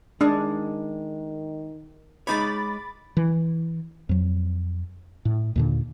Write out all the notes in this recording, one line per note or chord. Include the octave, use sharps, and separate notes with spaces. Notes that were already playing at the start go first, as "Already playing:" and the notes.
D#3 G#3 D4 G#4
G#3 D#4 C#5 B5 D6 A6
E3
F2 F#3
A2
D#2 A#2 D3